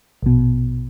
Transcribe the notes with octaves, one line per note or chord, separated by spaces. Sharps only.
A#1 B2